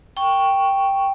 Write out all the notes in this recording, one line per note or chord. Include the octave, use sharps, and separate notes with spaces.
G5 C#6